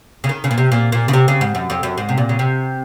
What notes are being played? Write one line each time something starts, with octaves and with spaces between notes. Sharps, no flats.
C#3
D#3
C#3
A#2
C3
A#2
A#2
C#3
C3
C#3
G#2
F#2
F2
F#2
G#2
C3
A#2
C#3
C3